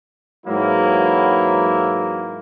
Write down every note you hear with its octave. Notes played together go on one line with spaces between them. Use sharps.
G#2 E3 F#3 A#3 E4